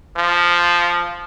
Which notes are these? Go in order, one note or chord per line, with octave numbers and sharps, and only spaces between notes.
F3